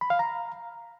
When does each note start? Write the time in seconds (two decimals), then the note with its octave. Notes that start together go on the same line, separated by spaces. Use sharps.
0.01 B5
0.10 F5
0.19 A#5